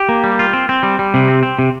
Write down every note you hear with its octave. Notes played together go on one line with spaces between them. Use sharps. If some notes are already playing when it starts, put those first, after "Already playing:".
Already playing: G4
A#3
G3
F4
C4
C4
G3
G3
C3
C4
C4
C3